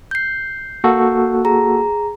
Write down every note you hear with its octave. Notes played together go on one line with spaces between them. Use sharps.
G6 C7
A#3 F#4 A4
G#4 A#5